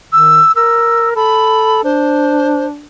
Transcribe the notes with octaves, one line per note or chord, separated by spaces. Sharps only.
D#3 E6
A#4 E6
A4 B5
D4 C5